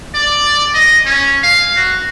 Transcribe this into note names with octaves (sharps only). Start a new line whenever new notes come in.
D5
D#5
C#4
F5
F#4